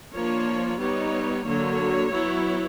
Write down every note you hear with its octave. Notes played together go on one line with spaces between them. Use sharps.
F3 A#3 D4 C#5
G3 B3 D#4 C#5
D3 F#3 A#3 C#5
F#3 B3 E4